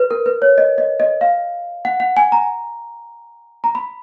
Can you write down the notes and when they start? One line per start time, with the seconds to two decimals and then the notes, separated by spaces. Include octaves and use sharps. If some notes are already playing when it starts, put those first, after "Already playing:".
Already playing: B4
0.11 A#4
0.26 B4
0.42 C#5
0.58 D#5
0.78 D#5
1.00 D#5
1.21 F5
1.85 F#5
2.00 F#5
2.17 G#5
2.32 A#5
3.64 A#5
3.75 B5